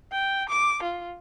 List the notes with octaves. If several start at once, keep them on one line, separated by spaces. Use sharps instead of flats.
G5
D6
F4